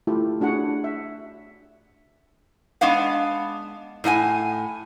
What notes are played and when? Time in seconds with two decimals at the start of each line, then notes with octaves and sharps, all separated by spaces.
0.07 A3 E4 F4 G4
0.41 A3 D4 F#4 G#4 F#5
0.84 E5
2.81 G#3 B3 D4 F5 F#5
4.04 A2 D4 F#5 G#5